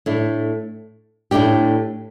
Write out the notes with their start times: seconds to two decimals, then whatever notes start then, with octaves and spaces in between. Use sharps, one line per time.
0.06 A2 A3 D4
1.31 A2 A3 D4 G4